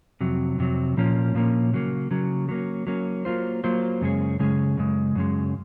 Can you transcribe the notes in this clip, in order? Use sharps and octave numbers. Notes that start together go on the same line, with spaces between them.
F2 C3 F#3
F2 C3 F#3
A#2 F3 A#3 C#4
A#2 F3 A#3 C#4
C#3 F#3 A#3
C#3 F#3 A#3
F#3 A#3 C#4
F#3 A#3 C#4
F#3 A#3 F4 C5
F#3 A#3 F4 C5
F#2 C#3 G#3 C#4 G#4
F#2 C#3 G#3 C#4 G#4
F#2 C#3 G#3
F#2 C#3 G#3